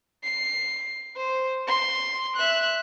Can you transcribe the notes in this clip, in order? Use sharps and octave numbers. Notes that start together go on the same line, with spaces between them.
C7
C5
C6
E5 F#6